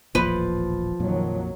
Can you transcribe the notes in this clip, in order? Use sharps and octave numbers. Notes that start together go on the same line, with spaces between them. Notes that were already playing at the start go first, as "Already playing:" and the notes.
D#1 A1 A#2 F3 B4
A#1 F2 A#2 D#3 F#3